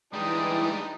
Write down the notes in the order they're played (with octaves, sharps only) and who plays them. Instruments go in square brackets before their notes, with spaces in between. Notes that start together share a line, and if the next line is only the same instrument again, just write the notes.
[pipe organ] E3 [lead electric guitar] G3 G#3 [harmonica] D4 D#4 G4 [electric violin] D#6